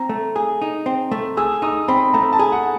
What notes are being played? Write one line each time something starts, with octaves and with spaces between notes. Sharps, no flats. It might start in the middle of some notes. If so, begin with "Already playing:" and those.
Already playing: C4 A#5
A3
G#4
D#4
C4
A3
G#4 E6
D#4 D#6
C4 B5
A3 A#5
A5
G#4
F#5